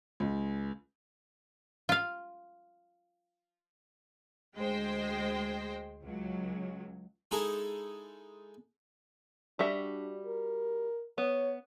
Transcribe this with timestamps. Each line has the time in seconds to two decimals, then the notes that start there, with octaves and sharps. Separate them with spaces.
0.20 C#2
1.89 F4 F5
4.55 D2 G#3 C5 G5
6.03 C#2 F#3
7.31 G#3 D#4 E4 G#4 A4
9.59 G3 D4 F#4 E5
10.26 A#4
11.18 B3 C#5